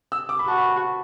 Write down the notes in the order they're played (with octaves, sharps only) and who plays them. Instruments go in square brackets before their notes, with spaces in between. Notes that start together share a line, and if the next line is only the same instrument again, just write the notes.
[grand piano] E6
D6
B5
[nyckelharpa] F#4 [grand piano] A5
[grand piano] B5